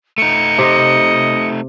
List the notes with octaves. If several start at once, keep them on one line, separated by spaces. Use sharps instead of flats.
A3 D#4 C#7
C3 D#5